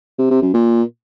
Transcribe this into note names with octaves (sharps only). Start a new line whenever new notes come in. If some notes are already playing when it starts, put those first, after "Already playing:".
C3
C3
F#2
A#2